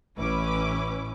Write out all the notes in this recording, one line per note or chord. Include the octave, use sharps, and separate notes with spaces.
A1 C#4 E4 B4 D6